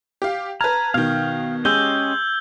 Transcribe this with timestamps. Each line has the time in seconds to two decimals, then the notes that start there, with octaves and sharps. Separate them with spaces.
0.22 G4 F5
0.61 B4 A5 A#5 F6 G#6
0.94 B2 D#3 F5 G5
1.65 G#3 C#4 G4 D#5 E6 G6 G7